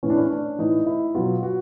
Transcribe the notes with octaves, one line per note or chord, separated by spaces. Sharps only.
A2 E3 C#4
D4
C#4
D4
A2 E3 D#4
E4
B2 F#3 F4
F#4